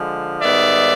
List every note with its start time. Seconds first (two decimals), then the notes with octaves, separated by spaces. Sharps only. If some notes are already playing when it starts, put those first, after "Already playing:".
Already playing: D3 F3 G#3
0.42 G#2 D#3 G3 B3 D5 E5